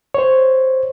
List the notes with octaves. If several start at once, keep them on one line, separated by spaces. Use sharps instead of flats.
C5 C#5